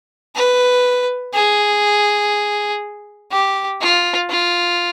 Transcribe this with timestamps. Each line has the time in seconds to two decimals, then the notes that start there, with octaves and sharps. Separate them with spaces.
0.35 B4
1.34 G#4
3.32 G4
3.81 F4
4.30 F4